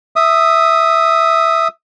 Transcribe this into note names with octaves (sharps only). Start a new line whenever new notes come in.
E5 D#6